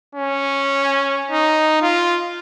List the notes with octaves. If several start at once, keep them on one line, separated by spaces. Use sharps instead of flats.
C#4
D#4
F4